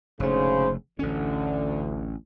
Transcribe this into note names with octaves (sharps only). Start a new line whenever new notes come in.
F1 D2 G#2 C#3 A3 C5
A1 D2 D3 C#4